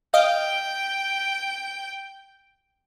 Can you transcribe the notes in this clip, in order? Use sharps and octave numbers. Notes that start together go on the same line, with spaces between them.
D#5 F5 G5